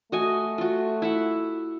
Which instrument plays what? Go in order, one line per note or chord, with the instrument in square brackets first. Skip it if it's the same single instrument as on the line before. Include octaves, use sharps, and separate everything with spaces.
[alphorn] A3 [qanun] F#4 D#5 G#5
[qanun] F4 F#4
E4 E5 F#5